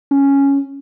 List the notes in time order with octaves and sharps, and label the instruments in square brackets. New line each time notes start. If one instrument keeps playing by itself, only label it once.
[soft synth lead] C#4